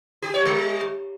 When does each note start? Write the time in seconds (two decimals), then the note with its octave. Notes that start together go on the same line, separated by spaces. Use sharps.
0.22 G4
0.34 C#5
0.45 G3